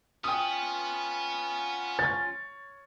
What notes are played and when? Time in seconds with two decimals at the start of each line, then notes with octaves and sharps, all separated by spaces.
0.24 B3 C#4 F4 G5 D#6
1.99 C#5 A6